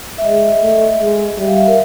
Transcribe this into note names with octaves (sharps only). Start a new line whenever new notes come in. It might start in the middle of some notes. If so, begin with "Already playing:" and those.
E5
G#3 D#5
A3
G#3
G3 E5
F5
E5
A#4